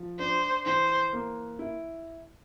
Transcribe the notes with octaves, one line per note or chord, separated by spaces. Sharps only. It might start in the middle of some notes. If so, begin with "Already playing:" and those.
Already playing: F3
D4 C5
E3 C5
A#3
E4